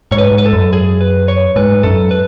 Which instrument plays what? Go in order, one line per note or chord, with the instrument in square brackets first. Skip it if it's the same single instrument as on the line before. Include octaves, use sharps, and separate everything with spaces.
[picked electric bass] G#2 [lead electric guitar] C#5
[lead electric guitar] B4
[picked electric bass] G#2
[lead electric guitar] B4
A4
[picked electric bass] F#2
[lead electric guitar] G#4
B4
C#5
[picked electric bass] G#2 [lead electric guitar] B4
[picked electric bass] F#2 [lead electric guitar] A4
[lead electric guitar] B4